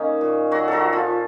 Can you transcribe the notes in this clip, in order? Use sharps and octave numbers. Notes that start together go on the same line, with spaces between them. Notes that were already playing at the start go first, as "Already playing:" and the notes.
Already playing: D#3 A#3 C#4 D#4
A#2
A#2 F#3 F#4
F#3 F#4 A4
F3
F3 F4